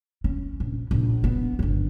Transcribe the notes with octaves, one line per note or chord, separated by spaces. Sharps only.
C#4
A#1
A#1 D#4
B3
G1 F#2